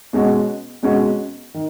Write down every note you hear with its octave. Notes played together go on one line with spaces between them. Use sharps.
B2 G#3 C#4 F#4
B2 G#3 C#4 F#4
D#3